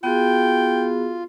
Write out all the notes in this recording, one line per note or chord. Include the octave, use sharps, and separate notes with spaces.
B3 F4 F#4 G#4 G5